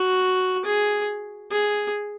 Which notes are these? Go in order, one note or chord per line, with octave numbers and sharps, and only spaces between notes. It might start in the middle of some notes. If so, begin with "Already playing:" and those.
Already playing: F#4
G#4
G#4